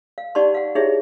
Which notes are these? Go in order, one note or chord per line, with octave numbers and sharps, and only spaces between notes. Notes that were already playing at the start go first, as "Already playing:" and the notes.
F5
D#4 G4 D5 F#5 A5 C6
F5 F#5
D#4 E4 G4 G#4 C#5 E5